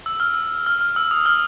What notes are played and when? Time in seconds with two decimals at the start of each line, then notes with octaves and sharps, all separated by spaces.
0.06 E6
0.20 F6
0.34 E6
0.66 F6
0.81 F6
0.96 E6
1.11 D#6
1.26 F6